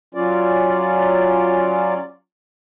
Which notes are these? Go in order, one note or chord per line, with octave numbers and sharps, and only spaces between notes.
F#3 C#4 F4 D5